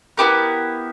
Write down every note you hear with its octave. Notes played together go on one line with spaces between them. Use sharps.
B3 E4 G4 A#4